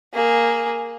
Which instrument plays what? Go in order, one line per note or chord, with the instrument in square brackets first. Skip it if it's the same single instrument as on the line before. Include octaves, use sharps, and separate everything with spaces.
[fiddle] A#3 G#4